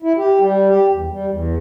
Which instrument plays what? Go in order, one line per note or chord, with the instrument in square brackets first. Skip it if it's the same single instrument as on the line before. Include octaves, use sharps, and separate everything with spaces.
[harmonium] E4
G4
G3
G4
E2
G3
E2